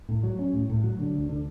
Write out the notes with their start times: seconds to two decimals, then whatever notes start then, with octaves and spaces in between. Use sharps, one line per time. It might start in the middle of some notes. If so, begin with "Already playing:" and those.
0.09 A2
0.23 F#3
0.39 C#4
0.53 A2
0.69 A2
0.83 F#3
0.99 D3
1.14 D2
1.29 D3